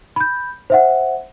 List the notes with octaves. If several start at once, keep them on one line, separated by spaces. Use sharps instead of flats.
B5 G6
C5 E5 F#5